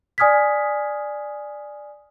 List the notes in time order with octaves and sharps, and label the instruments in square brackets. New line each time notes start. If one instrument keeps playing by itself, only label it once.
[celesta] D5 G#5 D#6 F6 G#6 B6